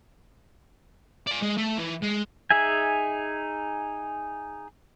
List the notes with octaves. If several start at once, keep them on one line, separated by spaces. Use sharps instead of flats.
D5 G#5
G#3
A3
E3
G#3
D#4 G#4 E5 G#5